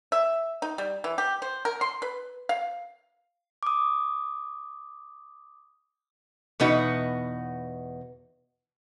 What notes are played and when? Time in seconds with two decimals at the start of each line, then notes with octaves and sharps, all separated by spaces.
0.12 E5
0.62 D#4
0.78 G3
1.04 E3
1.18 G4
1.42 C5
1.65 A#4
1.81 C6
2.02 B4
2.49 F5
3.63 D6 D#6
6.60 E2 B2 B3 D#4 F#4